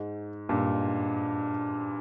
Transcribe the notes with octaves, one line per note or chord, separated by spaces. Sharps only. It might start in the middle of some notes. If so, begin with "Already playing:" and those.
Already playing: G#2
G2 A#2